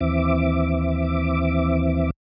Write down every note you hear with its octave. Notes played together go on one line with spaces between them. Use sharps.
D#2 E3 C4 E5 D6